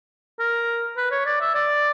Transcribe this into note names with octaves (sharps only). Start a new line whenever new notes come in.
A#4
B4
C#5
D5
E5
D5